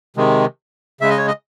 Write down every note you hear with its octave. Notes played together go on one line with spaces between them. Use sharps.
C3 D#3 G#3
C#3 G#3 E5
D#5
C#5
D#5